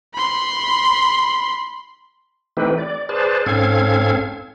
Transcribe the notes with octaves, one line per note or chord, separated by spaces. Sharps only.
B5 C6
E3 A3 C4 D#4 G4 B4
D5
G#4 B4 C5 D5 A5
G#2 C4 C#4 A4 F5 G#6